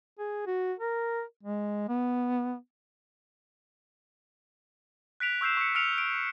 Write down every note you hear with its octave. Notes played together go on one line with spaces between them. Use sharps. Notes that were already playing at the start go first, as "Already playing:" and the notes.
G#4
F#4
A#4
G#3
B3
F#6 B6 D7 F7
C#6 E6 G6 C7 E7
C#6 C#7
E6 F6 B6 C#7 D7 F7
D7